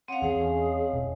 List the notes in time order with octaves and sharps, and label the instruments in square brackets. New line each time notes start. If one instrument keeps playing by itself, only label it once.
[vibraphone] C4 F5 [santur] C#4 [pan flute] F#5
[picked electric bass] E2 [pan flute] G#4
[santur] G#3 A3 C#4
[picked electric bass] E1